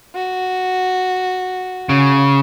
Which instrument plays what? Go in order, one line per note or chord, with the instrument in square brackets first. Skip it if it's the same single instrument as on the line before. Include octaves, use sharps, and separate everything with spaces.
[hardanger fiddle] F#4
[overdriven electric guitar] C#3